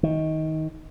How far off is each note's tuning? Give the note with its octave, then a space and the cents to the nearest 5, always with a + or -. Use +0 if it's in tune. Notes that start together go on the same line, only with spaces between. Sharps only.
D#3 +20